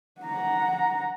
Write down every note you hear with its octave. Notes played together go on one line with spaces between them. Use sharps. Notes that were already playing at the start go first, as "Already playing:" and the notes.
F#5 A#5